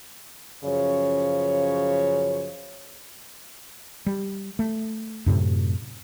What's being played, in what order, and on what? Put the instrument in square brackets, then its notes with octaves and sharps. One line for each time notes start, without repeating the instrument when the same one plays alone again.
[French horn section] F#2 C#3 F3 C#5
[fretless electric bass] G3
A3
F#2 A2 C3